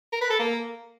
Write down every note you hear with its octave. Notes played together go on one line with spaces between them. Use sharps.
A#4
B4
A4
A#3